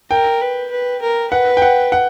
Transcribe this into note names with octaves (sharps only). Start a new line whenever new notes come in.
A#4 G5
B4
B4
A#4
B4 F#5
G5
F#5
F#5